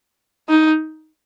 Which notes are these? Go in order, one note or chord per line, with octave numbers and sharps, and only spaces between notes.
D#4